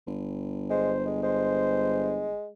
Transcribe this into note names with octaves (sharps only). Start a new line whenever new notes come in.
G1
G#3 C5
G#3
G#3 C5